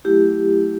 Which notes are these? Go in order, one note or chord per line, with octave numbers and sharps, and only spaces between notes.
F#3 A3 E4 G4